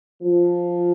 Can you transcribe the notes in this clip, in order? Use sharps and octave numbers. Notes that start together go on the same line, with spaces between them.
F3